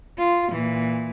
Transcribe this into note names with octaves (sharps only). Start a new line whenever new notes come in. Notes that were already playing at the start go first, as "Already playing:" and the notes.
F4
A#2 E3